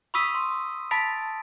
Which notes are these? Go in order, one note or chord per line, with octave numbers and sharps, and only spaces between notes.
B5 C#6 D#6 E6 B6 D#7
C6
A5 B5 A6 B6 D7